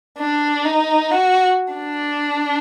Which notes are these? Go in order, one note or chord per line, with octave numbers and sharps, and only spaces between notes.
D4
D#4
F#4
D4